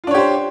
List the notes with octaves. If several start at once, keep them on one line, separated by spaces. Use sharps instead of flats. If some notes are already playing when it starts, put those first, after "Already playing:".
D4 F4 G4 C5 C#5